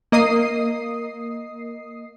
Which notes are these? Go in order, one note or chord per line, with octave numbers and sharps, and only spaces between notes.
A#3 D#5 D#6 C7